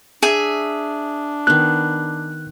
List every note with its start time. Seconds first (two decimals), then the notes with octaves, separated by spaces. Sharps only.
0.23 D4 G#4 E5
1.47 D#3 B3 F#6